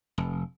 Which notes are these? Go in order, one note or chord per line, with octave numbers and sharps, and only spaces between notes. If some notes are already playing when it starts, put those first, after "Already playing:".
F1